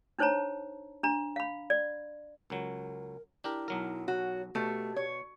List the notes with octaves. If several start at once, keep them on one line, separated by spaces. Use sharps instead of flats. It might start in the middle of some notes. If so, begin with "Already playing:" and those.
D4 D#4 C5 C#5 A5 A#5
D4 A#5
F5 B5
D5
C#2 F#3 A#4
D4 E4 G4 A#4
B1 F#3 A#4
F#4 C#5
B2 A3 G4
C#5